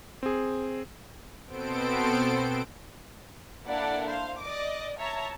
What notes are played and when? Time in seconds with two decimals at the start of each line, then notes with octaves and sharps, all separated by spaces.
0.23 C4 G#4
1.46 B2 B3 C4 A4 C5 D7
3.67 A#3 D4 E4 A4 D5 F#5
4.09 C5 F5
4.42 D5 D#5 D6
4.99 C#5 E5 A5 A#5